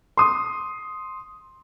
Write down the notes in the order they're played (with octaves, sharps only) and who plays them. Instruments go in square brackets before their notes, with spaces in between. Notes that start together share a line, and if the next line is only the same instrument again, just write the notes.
[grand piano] C6 D#6